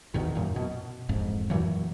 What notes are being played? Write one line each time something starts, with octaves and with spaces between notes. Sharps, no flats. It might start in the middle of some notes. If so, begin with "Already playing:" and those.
E2 B2 D#3
F#2 A#2
B2
E1 F2 G#2
F#2 A#2 E3 F#3